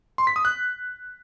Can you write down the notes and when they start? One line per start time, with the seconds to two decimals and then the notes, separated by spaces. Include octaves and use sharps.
0.18 C6
0.27 B6
0.36 D#6
0.45 F#6